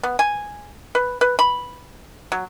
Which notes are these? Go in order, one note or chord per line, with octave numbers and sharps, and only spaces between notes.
B3
G#5
B4
B4
B5
F#3